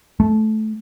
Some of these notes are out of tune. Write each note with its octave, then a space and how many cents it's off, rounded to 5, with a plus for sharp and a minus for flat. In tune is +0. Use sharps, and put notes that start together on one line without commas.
A3 -20